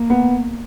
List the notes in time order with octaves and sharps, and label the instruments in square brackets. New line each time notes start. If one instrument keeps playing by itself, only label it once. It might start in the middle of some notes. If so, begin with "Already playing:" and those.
Already playing: [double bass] A#3
[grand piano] B3